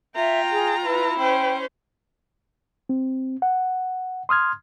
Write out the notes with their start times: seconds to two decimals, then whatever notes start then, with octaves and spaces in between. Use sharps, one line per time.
0.15 F4 E5 G5 A#5
0.52 G#4
0.85 E4 B4
1.19 C#4 C5 G5
2.89 C4
3.42 F#5
4.29 C6 D#6 F6 G#6